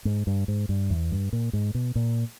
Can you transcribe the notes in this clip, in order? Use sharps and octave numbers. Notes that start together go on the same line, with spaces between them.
G#2
G2
G#2
G2
E2
G2
A#2
G#2
B2
A#2